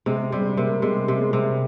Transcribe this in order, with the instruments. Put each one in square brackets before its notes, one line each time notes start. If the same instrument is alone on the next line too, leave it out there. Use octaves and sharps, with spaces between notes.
[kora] C3 [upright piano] G#3
[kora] C3 [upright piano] G3
[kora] C3 [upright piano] A#3
[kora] C3 [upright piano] G#3
[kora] C3
[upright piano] G#3
[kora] C3